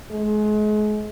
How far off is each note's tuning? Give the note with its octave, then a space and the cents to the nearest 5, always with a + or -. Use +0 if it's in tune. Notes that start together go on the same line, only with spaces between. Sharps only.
G#3 +35